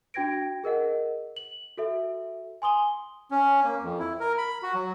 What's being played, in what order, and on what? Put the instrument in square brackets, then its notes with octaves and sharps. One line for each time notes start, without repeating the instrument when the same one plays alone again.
[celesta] D4 F#4 G5 G#6 A#6 D7
G#4 A#4 D#5 F#5
F#7
F#4 A4 E5
G#5 C6 D#6 G7
[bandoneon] C#4
A#3
F2
E4
A#4
B5
F#4
F#3